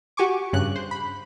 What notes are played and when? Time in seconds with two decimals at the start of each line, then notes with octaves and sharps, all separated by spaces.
0.17 F#4 G4 G#5 C#6 D6
0.53 G2 C#3 F#6
0.76 C5
0.91 B5